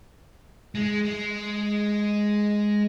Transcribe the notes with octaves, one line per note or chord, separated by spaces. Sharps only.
G#3
G#3